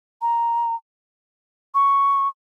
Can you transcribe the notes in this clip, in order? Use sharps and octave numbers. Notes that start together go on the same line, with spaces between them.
A#5
C#6